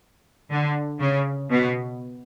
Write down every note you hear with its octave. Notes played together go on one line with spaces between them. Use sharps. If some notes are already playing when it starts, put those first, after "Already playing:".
D3
C#3
B2